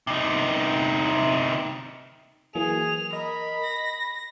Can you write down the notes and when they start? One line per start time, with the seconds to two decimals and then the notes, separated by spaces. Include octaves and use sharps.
0.07 C3 D#4
2.55 E3 F#3 A#3 G#4 F7
3.13 A#4 D#5 B5
3.63 A#6